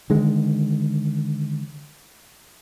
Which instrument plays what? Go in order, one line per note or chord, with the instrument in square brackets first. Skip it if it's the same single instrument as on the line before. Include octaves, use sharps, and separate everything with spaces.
[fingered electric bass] D3 D#3 G#3